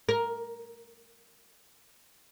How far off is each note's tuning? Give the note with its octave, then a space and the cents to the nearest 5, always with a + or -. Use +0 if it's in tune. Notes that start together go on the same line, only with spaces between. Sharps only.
A#4 +10